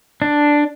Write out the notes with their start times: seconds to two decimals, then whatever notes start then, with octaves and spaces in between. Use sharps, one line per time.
0.22 D4